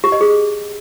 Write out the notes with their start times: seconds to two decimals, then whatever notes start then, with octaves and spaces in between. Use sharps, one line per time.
0.04 G4
0.12 D#5
0.21 G#4